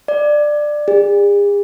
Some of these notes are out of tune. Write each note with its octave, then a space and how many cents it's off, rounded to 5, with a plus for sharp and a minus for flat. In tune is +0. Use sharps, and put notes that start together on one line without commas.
D5 +15
G#4 -45